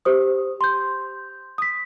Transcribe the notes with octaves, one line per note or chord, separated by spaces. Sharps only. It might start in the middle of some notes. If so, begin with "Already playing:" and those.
G4 C5 D#6
C6 G6
D#6 B6